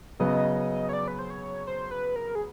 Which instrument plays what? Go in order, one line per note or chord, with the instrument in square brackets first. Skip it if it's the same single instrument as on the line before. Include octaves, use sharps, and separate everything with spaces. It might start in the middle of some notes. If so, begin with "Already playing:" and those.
[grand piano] C#3 F#3 B3 [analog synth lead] D#5
[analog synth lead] C#5
D5
B4
C5
C#5
C5
B4
A#4
G#4